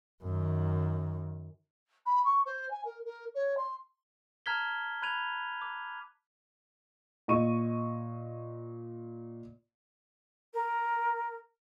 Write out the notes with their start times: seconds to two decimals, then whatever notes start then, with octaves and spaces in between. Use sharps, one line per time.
0.23 F#2 D#3
2.06 B5
2.25 C#6
2.46 C5
2.71 G#5
2.85 A#4
3.05 A#4
3.35 C#5
3.57 C6
4.46 A5 A#5 F6 G#6 B6 G7
5.02 B5 F#6 G#6 D#7 F7
5.62 D6
7.28 A#2 D#5 C#6 D#7
10.53 A#4